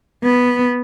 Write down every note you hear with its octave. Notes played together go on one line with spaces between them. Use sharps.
B3